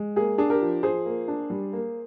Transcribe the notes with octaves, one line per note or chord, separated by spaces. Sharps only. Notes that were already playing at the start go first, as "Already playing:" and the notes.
Already playing: G#3
A#3 G#4
D4 G#4
G4 A#4
F3
F3 G#4 C5
A#3
D4
G3
A#3